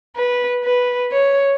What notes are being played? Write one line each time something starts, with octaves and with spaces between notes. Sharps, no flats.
B4
B4
C#5